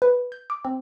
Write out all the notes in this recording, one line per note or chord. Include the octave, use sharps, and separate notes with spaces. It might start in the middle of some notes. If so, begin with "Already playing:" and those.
B4
G6
D6
C4